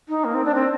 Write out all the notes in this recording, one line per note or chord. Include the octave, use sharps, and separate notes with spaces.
D#4
A#3
C4
D4
C4